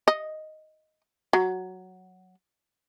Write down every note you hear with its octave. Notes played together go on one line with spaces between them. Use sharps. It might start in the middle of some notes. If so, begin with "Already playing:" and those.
D#5
F#3